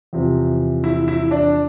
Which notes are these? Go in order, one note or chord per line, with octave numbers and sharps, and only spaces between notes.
E2 C3 F3
E4
E4
D4